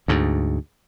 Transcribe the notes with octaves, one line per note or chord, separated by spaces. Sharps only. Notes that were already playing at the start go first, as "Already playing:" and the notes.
D2 G#2